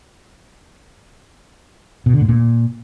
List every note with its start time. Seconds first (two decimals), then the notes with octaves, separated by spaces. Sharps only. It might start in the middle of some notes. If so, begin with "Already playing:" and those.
2.06 B2
2.14 D3
2.21 A2
2.29 A#2